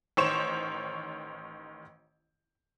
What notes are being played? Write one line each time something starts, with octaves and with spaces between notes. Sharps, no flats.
A1 D#3 C5 C#5 C#6 E7